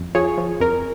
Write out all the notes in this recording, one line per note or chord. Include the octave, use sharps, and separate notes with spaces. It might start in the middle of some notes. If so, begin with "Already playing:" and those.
Already playing: F2
F3 G#4 C#5
F3
F2 A#4